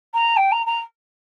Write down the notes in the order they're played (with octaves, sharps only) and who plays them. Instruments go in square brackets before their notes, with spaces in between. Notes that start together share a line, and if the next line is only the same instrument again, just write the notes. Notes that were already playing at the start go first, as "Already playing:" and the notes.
[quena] A#5
G5
A#5
A#5